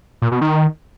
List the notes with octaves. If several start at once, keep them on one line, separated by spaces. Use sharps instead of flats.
A#2
B2
D#3